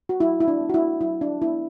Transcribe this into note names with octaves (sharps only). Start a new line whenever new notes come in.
F#4
F#3 E4
E4
D4
B3
F#4
E4
F#3 E4
D4
B3 E4